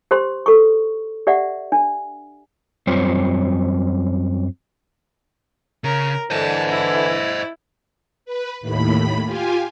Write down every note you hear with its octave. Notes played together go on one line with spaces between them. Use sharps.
G4 C5 C6
A4 C#6
G4 D5 E5 F#5
D4
F#2 G3 C4 F4 C5 C#5
C#3 A#4
D3 E3 C5 D#5 A5
E4
B4
D#2 A2 B5
F4 G4 G#5